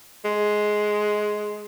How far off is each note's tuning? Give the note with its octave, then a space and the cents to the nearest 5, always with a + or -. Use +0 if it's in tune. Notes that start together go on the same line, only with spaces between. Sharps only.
G#3 +10